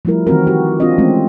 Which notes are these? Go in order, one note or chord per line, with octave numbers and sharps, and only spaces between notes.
F3 G3 A3 E4 A#4
D#3 E3 C4 F#4 A#4
F#4 G4
C4 D4 F4 D#5
E3 G#3 A3 C4 C#4